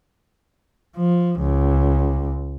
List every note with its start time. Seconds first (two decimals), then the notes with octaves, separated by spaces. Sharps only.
0.97 F3
1.40 C#2